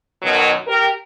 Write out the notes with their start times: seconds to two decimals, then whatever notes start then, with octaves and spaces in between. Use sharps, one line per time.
0.23 F#2 B2 D#3 F#3
0.67 G4 A#4